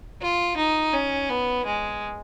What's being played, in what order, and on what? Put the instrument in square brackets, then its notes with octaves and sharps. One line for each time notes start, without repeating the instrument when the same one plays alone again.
[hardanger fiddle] F4
D#4
C#4
B3
G#3